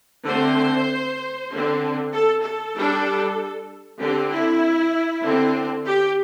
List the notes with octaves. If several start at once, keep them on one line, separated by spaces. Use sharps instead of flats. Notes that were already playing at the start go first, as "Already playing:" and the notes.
D3 A3 C4 C5
D3 C4
A4
A4
G3 D4
D3 C4 G4
E4
D3 C4
G4